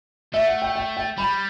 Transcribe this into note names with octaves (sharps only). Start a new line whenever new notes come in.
A3 E5
F#5
G5
G5
G5
G3 B5